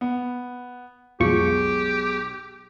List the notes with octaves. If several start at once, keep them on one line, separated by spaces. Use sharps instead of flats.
B3
B1 F2 B2 G#3 F4 G4 C#6